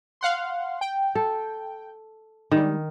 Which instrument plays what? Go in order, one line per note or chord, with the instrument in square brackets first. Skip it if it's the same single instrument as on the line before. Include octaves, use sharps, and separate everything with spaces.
[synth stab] F5 F#5 C6
G5
[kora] A4
[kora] D#3 [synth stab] G3 G#3